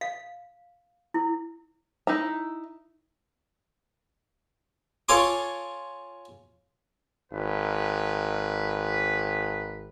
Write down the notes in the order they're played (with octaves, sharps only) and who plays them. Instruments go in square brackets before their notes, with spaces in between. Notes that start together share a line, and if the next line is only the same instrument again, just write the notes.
[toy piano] F5
E4
[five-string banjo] D#4 E4 A#5
[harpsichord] F4 A4 C#5 G#5 C6 D6
[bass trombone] G#1 [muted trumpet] B4